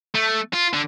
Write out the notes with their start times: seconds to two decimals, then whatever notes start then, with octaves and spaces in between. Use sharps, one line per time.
0.15 A3
0.53 F4
0.73 D3